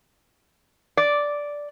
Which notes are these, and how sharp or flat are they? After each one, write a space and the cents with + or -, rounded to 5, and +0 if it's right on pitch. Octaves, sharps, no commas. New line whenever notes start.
D5 -5